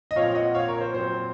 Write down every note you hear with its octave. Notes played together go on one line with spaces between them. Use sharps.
D#5
A#2 F3 C4 C#5 F5
D#5 F#5
C#5 F5
A#4 C#5
C5
A#2 F#3 C4 C5